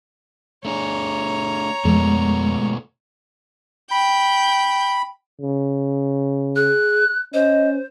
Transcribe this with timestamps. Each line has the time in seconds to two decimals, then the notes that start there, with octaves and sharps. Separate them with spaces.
0.65 A3 D4 G#4 C#5 A#5
1.85 F2 B2 G#3 A3 B3
3.91 G5 B5 G6
5.41 C#3
6.56 G#4 F#6
7.34 C#4 C5 D#5